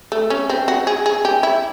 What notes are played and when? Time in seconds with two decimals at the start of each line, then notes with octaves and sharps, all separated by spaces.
0.12 A3
0.30 C#4
0.50 C4
0.68 F#4
0.87 G#4
1.06 G#4
1.25 G4
1.43 E4